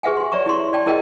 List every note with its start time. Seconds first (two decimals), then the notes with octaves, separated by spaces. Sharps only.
0.03 G4 G#4 B4 E5 F#5 G#5
0.17 G4 C6
0.32 C#5 D5 E5 A#5 C#6
0.46 E4 G4 C6 C#6
0.73 D5 G5 A5
0.86 E4 G#4 A#4 D#5 F#5 G5